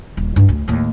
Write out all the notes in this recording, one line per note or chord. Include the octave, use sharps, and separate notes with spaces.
D#1
G2 D#4
D2
D#2 A2